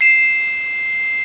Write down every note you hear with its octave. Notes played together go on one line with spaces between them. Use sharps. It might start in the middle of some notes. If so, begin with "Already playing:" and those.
C7 E7